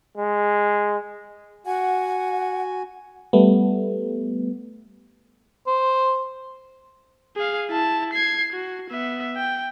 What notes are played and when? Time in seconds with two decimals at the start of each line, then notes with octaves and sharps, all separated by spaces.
0.18 G#3
1.66 F#4 F#5 G#5
3.33 G3 A3 B3
5.67 C5
7.36 G#4 F5
7.69 E4 A5
8.13 G#6 C7
8.53 F#4
8.91 B3 E5
9.36 G5